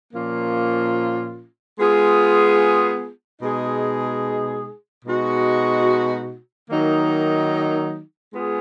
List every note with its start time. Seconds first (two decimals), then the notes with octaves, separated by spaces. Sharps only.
0.14 A#2 F3 A#3 C#4 F4
1.79 G#3 B3 F4 G#4
3.41 B2 G#3 D#4 G#4
5.05 B2 G#3 D#4 F#4
6.70 D#3 F#3 A#3 D#4
8.34 G#3 B3 F4 G#4